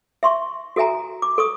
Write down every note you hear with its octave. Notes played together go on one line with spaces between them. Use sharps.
E5 C6 C#6
F#4 A4 E5 G#5 A#5
D6
A4 C#6 D#6